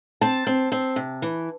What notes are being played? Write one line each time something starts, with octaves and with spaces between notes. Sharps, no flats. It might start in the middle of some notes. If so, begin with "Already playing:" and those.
C4 A5
C4
C4
C3
E3